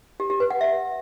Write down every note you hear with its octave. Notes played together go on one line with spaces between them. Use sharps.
G4
G4
B4
F#5
E5